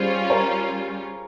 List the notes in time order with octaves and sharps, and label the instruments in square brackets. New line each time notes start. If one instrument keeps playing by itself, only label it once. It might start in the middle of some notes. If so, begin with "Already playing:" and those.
Already playing: [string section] G3 C#4 F4 [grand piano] G#4 C5
[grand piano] A#4 C#5